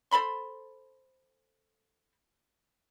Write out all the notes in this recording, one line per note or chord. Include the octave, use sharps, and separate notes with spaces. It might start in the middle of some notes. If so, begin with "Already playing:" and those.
A4 C5 B5 C6